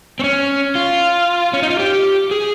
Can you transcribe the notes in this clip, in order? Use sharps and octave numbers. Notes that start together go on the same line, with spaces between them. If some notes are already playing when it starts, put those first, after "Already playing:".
C4
C#4
F4
C#4
D#4
F4
G4
G#4